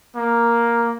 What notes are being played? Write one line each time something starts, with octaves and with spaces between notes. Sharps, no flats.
A#3